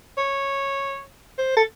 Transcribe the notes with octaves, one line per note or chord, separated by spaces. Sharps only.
C#5
C5
A4